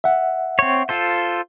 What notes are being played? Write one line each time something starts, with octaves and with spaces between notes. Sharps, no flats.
E5 F#5
C4 C#5
F4 A4 C5